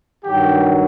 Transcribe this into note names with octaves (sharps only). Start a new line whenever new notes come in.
G2 D#3 F#3 G4 G5